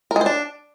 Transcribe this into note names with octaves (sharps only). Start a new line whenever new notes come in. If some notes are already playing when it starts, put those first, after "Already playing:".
A#4
G#3
C5
D4